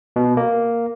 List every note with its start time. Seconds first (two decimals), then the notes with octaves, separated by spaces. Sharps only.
0.16 B2
0.37 A#3